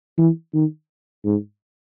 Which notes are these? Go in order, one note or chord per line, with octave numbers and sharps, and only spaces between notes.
E3
D#3
G#2